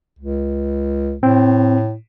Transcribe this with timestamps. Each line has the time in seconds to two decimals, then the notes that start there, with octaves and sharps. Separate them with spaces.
0.19 C#2
1.23 A2 C4